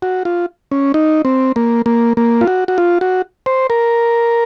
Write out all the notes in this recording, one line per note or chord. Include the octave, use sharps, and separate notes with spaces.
F#4
F4
C#4
D#4
C4
A#3
A#3
A#3
F4
F#4
F#4
F4
F#4
C5
A#4